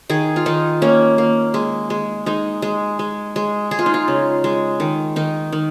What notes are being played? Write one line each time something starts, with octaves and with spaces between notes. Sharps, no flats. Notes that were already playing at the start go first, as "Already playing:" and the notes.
D#3 G#4
F4
D#3 D#4
A#3 C#4
A#3
G#3
G#3
G#3 D#4
G#3
G#3
G#3
G#3 G#4
F4
D#4
F4
C#3
G#3
D#3
D#3 D#4
D#3